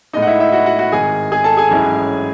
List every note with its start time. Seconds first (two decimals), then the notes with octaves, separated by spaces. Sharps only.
0.13 A2 G#3 D#4 D#5
0.22 F#5
0.27 E4 E5
0.40 E4 E5
0.52 F#4 F#5
0.66 F#4 F#5
0.79 F#4 F#5
0.92 G#1 G#2 D#3 G#4 G#5
1.32 G#4 G#5
1.44 A4 A5
1.57 G#4 G#5
1.70 A1 G#2 F#3 C#4 E4